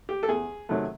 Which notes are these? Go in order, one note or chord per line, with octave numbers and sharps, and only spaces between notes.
G4
A4
E2 G#4
C3 D#3 F#3 A3